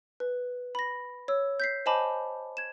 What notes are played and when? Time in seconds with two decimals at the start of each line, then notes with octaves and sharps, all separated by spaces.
0.20 B4
0.75 B5 A#6
1.28 C#5 E6
1.60 G6 B6 C7
1.86 C5 D#5 G#5 A5 B5 D6
2.57 G#6 E7